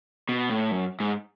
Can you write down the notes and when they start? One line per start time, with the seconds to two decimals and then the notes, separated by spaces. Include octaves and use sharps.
0.29 B2
0.50 A2
0.72 F#2
1.00 G#2